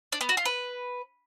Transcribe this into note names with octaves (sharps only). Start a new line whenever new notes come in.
D4
B3
F#4
F4
B4